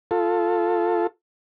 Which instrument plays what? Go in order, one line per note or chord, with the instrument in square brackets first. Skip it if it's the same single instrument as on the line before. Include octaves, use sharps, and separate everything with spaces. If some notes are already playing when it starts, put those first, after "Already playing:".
[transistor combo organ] F4 A4